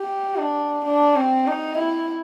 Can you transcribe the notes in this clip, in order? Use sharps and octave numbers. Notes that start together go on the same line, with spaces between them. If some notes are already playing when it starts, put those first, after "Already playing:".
Already playing: G4
D4
D4
C4
D#4
E4